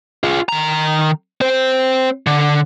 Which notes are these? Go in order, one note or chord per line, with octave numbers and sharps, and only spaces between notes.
F4 G#4
D#3 A#5
C4 C5
D3